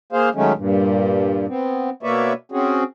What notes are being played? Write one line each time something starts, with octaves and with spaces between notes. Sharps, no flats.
A#3 G#4 C5 F5
D#3 F#3 G#3 A3 C#4
G2 A#2
B3 C4
B2 A#3 B4 C#5 D5 E5
C4 C#4 F#4 G#4